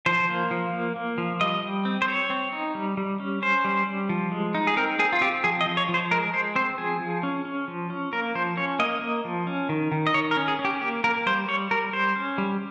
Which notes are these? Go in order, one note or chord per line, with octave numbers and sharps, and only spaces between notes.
F3 C5
A#3
F3
A#3
A#3
F3
G3 D#5
G3
C4
C5
C4 C#5
C4
D#4
G3
G3
C#4
C#4 C5
G3
G3
F3
G#3
D#4
G#4
C4 A#4
C4 G#4
F4
C4 G4
F3 G#4
D#5
F3
C#5
F3
C5
G#3 A#4
G#3 C5
C4 C5
F3 G#4
F3
C#4
C#4
F3
C#4
A#3 A#4
F3 C5
C#4 C#5
A#3 D#5
A#3
F3
C#4
D#3
D#3
D#5
D#3 C#5
A#4
C#4
G#4
C#4
G4
A#3 G4
A#3 A#4
G3 C5
G3 C#5
G3 A#4
G3 C5
C#4
G3